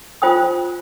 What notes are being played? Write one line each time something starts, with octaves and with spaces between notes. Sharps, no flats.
F4 C5 G5 D#6